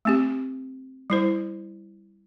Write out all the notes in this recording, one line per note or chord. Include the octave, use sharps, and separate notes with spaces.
A3 C4 G4
G3 E4 C5